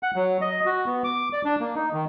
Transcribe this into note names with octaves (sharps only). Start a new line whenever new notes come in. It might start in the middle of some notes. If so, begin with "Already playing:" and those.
F#5
F#3
D#5
F#4
B3
D6
D5
D4
A#3
D#4
D#3